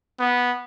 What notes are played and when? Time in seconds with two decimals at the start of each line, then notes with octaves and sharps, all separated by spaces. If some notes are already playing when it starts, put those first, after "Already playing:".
0.20 B3